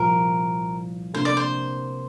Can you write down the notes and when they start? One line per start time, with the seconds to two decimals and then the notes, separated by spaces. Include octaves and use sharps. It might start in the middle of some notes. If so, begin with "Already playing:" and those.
Already playing: C2 A#2 F3 A#4
1.14 C3 A#3 D4 A#4 C5
1.25 D5
1.37 C5